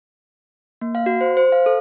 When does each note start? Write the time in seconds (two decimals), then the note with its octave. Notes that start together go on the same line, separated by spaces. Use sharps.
0.81 A#3
0.95 F5
1.06 F#4
1.21 C5
1.37 C5
1.52 F5
1.66 A4